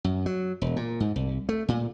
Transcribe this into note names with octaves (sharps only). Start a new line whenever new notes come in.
F#2
F#3
E1
A#2
G#2
C2
A3
A#2